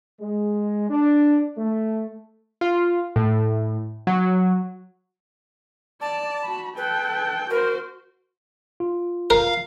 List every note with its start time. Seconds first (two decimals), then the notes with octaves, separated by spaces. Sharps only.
0.21 G#3
0.90 D4
1.57 A3
2.61 F4
3.16 A2
4.07 F#3
6.01 D5 A5
6.43 F#4 B5
6.77 A4 B4 G5
7.50 F#4 A#4 C5
8.80 F4
9.30 A#4 F5